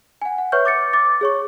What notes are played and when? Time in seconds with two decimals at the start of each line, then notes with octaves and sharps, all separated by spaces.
0.22 F#5 G#5
0.38 F#5
0.52 B4 C#5 E5 C#6 F6 G6
0.65 D6 A6 C#7
0.93 D6 A6
1.21 G#4 C#5 C#6